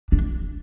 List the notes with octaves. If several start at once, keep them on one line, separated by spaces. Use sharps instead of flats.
D4